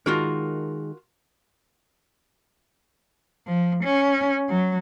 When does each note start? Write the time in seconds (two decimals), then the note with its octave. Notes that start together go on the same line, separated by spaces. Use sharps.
0.06 D#3 G#3 F4 F#4 A#4
3.47 F3
3.84 C#4
4.50 F#3